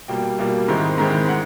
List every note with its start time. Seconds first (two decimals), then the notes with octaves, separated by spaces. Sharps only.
0.08 B2 G3 A#3 G5
0.39 B2 G3 A#3
0.68 G#2 D#3 G#3 C4 E4
0.98 G#2 D#3 G#3 C4 E4
1.28 G#3 F#5